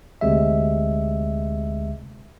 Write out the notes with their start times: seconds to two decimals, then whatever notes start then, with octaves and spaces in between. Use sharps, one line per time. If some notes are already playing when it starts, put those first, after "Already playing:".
0.21 D2 C3 G#3 E5